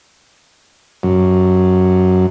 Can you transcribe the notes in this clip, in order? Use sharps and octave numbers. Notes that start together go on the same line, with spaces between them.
F#2